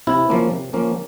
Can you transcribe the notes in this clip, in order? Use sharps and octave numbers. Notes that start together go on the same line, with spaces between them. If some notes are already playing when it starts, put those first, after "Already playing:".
C3 E4
F3 A#3 C#4
C3
F3 A#3 C#4